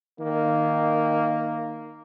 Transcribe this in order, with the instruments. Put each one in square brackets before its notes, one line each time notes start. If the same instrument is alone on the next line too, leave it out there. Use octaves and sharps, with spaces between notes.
[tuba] D#3 [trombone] A#3